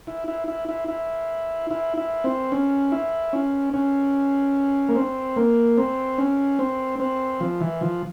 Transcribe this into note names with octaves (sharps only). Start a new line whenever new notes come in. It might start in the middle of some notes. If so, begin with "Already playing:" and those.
E4
E4
E4
E4
E4
E4
E4
C4
C#4
E4
C#4
C#4
A#3
C4
A#3
C4
C#4
C4
C4
F3
E3
F3